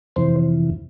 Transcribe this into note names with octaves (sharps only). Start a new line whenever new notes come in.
F2 C3 E3 C5